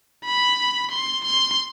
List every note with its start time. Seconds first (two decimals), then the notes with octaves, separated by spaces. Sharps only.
0.25 B5
0.91 C6
1.25 C6